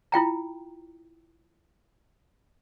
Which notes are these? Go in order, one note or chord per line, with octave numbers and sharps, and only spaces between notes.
E4 F4 G5 A#5